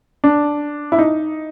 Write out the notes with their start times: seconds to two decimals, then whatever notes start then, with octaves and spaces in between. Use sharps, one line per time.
0.24 D4
0.92 E4
0.99 D#4